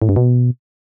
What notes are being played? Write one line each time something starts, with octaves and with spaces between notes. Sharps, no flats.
A2
G2
B2